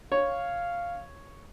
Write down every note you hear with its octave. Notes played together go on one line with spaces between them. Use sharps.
C#5 F5